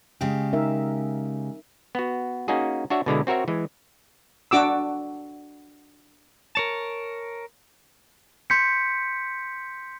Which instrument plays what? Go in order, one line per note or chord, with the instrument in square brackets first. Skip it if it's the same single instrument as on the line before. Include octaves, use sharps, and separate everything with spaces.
[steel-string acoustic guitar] C#3 G#3 G4
[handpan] D#4 A#4 E5
[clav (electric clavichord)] B3 F#4
A#3 C#4 D#4 F#4 G#4
D4 F#4 C#5 E5
B2 D3 G#3 E4
C4 F#4 A#4 C#5 E5
E3 G#3
[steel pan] D4 F#4 D6 E6
[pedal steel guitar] A#4 C#5 A5
[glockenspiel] C6 G6 B6 C#7